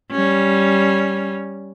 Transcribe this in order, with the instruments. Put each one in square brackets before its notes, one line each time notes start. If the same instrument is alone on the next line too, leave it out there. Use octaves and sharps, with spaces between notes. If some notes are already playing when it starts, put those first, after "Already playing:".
[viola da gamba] G3 C#4